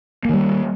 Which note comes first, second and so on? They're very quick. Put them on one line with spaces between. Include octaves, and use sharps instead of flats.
A#3 D#3 G3